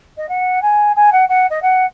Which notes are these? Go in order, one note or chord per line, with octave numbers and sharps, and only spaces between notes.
D#5
F#5
G#5
G#5
F#5
F#5
D#5
F#5